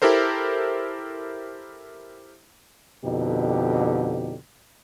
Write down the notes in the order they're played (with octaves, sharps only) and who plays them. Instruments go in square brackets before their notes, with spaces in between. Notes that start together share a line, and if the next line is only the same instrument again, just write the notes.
[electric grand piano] E4 G4 A4 A#4 C5
[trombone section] F2 B2 D3 D#4 G4